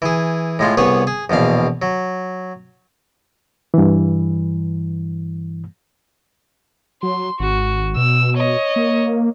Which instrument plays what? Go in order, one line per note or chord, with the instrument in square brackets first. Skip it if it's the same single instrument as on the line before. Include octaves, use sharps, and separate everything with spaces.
[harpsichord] E3 G#4
A2 G#3 F4
C2 B3 G#4 B4 C#5
G#4
A#1 E2 B2 F5
F#3
[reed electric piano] G2 E3
[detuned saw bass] F#3 [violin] C6
[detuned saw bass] G#1 [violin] F#4
[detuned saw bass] B2 [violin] E6
[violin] C#5 D#5
[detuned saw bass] A#3